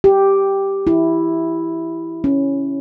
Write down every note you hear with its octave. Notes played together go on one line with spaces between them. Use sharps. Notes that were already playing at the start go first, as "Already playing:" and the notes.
G4
E4
C#4